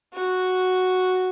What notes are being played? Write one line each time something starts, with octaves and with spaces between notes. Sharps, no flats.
F#4